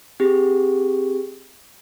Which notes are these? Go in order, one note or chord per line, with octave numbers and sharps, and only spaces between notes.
C4 G4 G#4